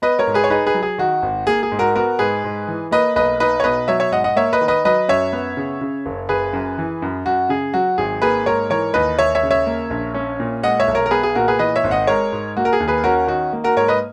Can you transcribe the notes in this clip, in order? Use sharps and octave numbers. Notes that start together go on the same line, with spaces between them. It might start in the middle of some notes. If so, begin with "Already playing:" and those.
B3 B4 D#5
A#4 C#5
G#2
G#4 B4
C#5
D#4 G#4 B4
G#4 B4
F#3
G#4
D#3 F#4
G#1
A#3 G#4
G#4
G#2
F#4 A#4
B3 F#4 A#4
G#2 G#4 B4
G#2
E3
A#3 B4 D#5
B1 B4 D#5
D#4 B4 D#5
C#5
B2 B4 D#5
F#3 C#5 E5
C#5 E5
G#2 D#5 F#5
D#5 F#5
A#3 C#5 E5
B4 D#5
D#3
B4 D#5
F#3 B4 D#5
F#2 C#5 E5
B3
C#3
C#3
F#1
F#1 G#4 B4
F#2
E3
F#2
F#2 F#4
C#3 G#4
F#3 F#4
G#1 G#4
A#3 G#4 B4
G#2 A#4 C#5
E3 A#4 C#5
D#2 B4 D#5
D#2 C#5 E5
C#5 E5
C#3
C#5 E5
A#3
A#1
C#4
A#2
G#3 D#5 F#5
C#5 E5
B1
A#4 C#5
A#4
B3 G#4 B4
G#4
A#2 F#4 A#4
G#4 B4
E3 B4 D#5
C#5 E5
G#1
D#5 F#5
G#3 A#4 C#5
G#2
A#3 F#4
A#4
G#4
D#2
G#4 B4
C#4 F#4 A#4
D#3 F#4
A#3
F#4 A#4
G#2 A#4 C#5
B4 D#5